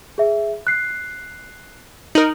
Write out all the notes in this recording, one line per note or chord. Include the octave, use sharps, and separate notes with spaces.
G#4 E5
F#6 C7
D#4 A#4 F#7